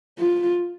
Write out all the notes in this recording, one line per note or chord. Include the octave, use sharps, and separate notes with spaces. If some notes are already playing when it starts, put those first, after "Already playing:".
F4